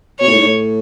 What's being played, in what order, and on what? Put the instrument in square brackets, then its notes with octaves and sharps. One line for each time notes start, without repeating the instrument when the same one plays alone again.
[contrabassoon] B2 [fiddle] C#5
[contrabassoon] A2
G#2
A2